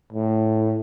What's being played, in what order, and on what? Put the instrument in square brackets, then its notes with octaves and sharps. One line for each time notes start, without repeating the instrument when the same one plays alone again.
[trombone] A2